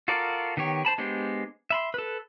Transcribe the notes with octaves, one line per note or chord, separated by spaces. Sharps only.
F4 F#4 A4 A#4 D5
D#3 B3 G4 C#5
C5 A5 B5
G#3 B3 D4 G4 C5
E5 B5 C6
A4 B4